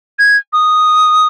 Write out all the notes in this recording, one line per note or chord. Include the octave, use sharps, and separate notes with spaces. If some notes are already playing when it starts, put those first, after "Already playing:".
G#6
D#6